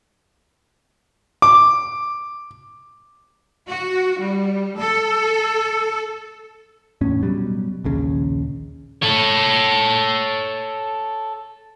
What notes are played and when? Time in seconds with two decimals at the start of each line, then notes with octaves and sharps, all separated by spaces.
1.42 D6
3.69 F#4
4.19 G3
4.77 A4
7.01 E2 A2 C#4
7.23 B2 F#3 G3
7.84 A#1 D#2 C#3
9.02 A4 C#5